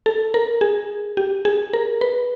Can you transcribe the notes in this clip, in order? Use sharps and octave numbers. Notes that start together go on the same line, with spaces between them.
A4
A#4
G#4
G4
G#4
A#4
B4